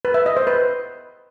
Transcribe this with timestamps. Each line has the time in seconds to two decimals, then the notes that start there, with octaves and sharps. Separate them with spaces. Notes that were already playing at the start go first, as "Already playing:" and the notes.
0.05 B4
0.14 E5
0.26 D#5
0.37 C5
0.47 B4